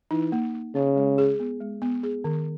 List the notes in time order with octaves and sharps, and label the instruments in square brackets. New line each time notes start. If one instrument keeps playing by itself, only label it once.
[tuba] E3 [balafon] D#4
[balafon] A#3
A#3
[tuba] C#3 [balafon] C#4
[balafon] G#3
G#4
B3
G#3
B3
G#4
D#3